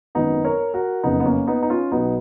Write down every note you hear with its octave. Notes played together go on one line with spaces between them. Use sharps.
G#1 F#2 D#3 B3 D#4
A#4 C#5
F#4 A#4
F#1 F2 C#3 B3 D#4
B3
A#3 C#4
B3 D#4
D#4
C#4 F4
B1 B2 B3 D#4